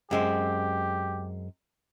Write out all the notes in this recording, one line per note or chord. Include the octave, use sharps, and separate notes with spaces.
F#2 G#3 C4 G4